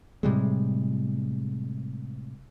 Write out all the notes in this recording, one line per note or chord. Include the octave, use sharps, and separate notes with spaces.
A2 C3 G3 G#3